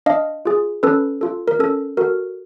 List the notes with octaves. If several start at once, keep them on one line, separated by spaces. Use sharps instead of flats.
D4 D#5 F5
F4 G#4
C#4 A4 B4
F4 A4
A#4
C#4 A4
F#4 A4 A#4